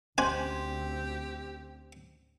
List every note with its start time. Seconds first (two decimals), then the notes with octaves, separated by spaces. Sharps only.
0.18 D2 C4 C#4 G4 C5 G#5 C6